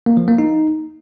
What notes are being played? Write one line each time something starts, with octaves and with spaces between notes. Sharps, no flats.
A#3
F3
A#3
D#4